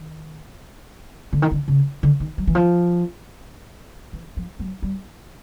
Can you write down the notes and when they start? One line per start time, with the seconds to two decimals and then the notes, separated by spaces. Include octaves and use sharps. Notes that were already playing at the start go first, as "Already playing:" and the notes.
Already playing: D#3
1.33 D3
1.42 D#3
1.52 D3
1.68 C#3
2.03 D3
2.20 D#3
2.38 F#3
2.47 E3
2.55 F3
4.13 E3
4.37 F3
4.59 F#3
4.83 G3